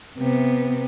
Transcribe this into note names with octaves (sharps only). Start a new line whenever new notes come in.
C3 B3